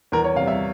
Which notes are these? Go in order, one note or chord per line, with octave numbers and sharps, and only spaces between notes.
E2 A#4
C#5
C3 G3 F5
E5